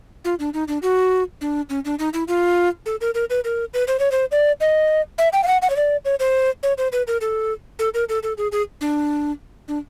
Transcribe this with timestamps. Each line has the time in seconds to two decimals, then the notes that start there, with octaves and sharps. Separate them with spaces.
0.25 F4
0.39 D4
0.54 D#4
0.68 D4
0.82 F#4
1.41 D4
1.70 C#4
1.85 D4
1.99 D#4
2.13 E4
2.28 F4
2.86 A4
3.01 A#4
3.15 A#4
3.30 B4
3.44 A#4
3.74 B4
3.88 C5
3.99 C#5
4.12 C5
4.32 D5
4.60 D#5
5.18 E5
5.33 G5
5.43 F5
5.47 F#5
5.62 F#5
5.70 C#5
5.76 D5
6.05 C#5
6.20 C5
6.63 C#5
6.78 C5
6.92 B4
7.07 A#4
7.21 A4
7.79 A4
7.94 A#4
8.09 A4
8.23 A4
8.38 G#4
8.52 G#4
8.81 D4
9.68 D4